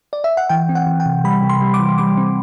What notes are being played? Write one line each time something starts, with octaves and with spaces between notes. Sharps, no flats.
D5
E5
F#5
E3 G5
C4
F#5
E3
G5
C3
G3 B5
C3
C6
G3
D6
E3
G3 D6
C4